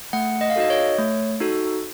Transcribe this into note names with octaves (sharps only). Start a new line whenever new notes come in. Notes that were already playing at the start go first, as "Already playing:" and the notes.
A3 F#5
D#5
F5
D#4 F#4 A4 D#5
C#5
A3
D#4 F#4 A4